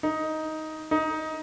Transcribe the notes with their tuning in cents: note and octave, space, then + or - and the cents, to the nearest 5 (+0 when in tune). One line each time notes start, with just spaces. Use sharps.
D#4 +10
D#4 +15